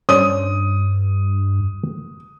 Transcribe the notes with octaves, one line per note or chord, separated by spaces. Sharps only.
G2 C#4 C5 D5 D#6